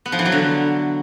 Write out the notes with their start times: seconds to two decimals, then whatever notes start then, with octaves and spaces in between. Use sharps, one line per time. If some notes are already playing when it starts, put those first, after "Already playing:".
0.06 B3
0.12 F3
0.19 E3
0.25 F#3
0.32 D3